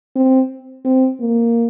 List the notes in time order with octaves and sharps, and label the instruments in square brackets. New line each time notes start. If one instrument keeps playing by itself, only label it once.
[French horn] C4
C4
A#3